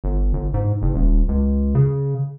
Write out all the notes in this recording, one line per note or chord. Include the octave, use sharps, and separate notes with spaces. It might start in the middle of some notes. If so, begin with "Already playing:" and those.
G1
G1
G#2
F#1
D#1
C#2
C#3